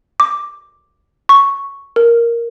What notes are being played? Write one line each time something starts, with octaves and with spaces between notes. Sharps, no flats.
D6
C#6
A#4